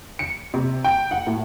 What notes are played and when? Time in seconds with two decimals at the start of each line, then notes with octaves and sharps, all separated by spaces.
0.19 C#7
0.54 C3
0.84 G5
1.11 F#5
1.27 A2